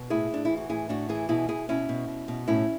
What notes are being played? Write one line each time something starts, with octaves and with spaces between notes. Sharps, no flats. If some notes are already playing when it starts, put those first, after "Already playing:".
Already playing: B2
A2 E4 G#4
A2 D4
E3 E4
F#4
A2 E4 G#4
A2 D4 F#4
E3 E4 G#4
B2 E4 G#4
B2 E4 G#4
B2 C#4 E4
B2
B2
B2
A2 C#4 E4